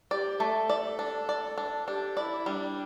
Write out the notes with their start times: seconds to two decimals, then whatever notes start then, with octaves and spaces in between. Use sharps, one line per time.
0.11 G4 D5
0.40 A3 A4
0.70 D5
0.99 D4
1.29 D5
1.58 D4
1.87 D4 G4
2.17 E4 D5
2.46 G3 D4